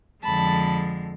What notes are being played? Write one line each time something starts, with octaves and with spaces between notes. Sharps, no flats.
F2 D3 F3 G#3 A5 B5